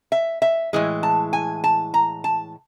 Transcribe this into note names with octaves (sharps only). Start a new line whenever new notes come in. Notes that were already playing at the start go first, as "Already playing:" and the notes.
E5
E5
A2 E3 G#3
A5
G#5
A5
A#5
A5